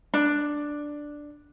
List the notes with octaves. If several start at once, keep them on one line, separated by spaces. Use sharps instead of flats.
D4